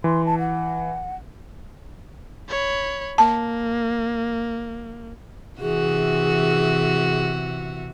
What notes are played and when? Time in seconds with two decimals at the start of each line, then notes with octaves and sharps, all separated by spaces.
0.04 E3 C6
0.26 A5
0.39 F#5
2.49 C#5 B5
3.18 A#3 A5
5.60 C3 E3 F#4 G#4